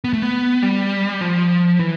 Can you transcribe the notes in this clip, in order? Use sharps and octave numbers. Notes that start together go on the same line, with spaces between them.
B3
A3
B3
G3
F3
E3